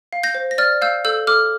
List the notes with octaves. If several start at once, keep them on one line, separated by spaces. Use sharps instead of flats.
F5
G6 A#6
C5
A#6
D5 F6 A6
F5 E6 G6
A4 E6 G6
A4 D6 F6